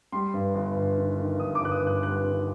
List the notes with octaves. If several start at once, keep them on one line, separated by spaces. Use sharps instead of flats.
G3 C6
G2
G1
G1
D#3
D#3
G2 D#6
D6
G1 F#6
D#6
G2
F#6
G3 F#6
D#3